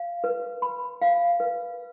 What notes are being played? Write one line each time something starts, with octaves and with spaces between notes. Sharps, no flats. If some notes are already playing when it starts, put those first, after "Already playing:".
Already playing: F5
B4
B5
F5
B4